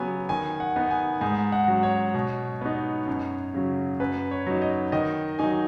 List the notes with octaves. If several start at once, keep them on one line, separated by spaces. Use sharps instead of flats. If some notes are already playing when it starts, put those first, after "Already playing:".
Already playing: C#3 F#3 B3 G#5
D#3 G#5
F#5
B3 D#4
G#5
G#2 G#5
F#5
F#3 C#4
C#5
B2
B3 D#4
F#2
C#3 F#3
F#2 B4
C#5
F#3 D#4
D#5
D#3 D#5
F#3 D#4 G#5